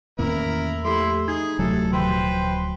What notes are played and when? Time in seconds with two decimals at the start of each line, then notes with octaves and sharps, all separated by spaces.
0.19 E2 A2 D#3 A#3 C#4 E4 A#4
0.85 F3 A3 E4 G4 A4 C6
1.28 D#4 G#4 G#6
1.59 D1 C3 F#3 A3 G4 A4
1.93 C3 D#3 E3 B4 C5 G5 C6
2.05 A#2 F3